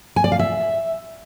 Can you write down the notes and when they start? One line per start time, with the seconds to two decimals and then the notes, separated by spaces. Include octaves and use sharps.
0.16 G#5
0.24 D5
0.32 F5
0.39 E5